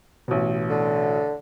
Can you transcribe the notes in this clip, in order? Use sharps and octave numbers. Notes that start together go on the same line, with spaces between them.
A1 B2
D3